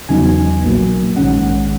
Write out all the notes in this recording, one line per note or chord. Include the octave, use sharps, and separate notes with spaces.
E2 C#3 F#3 B3 D#4 G#5
B1 A#2 F#3 A#3
A#1 G#2 D#3 G#3 C#4 F#5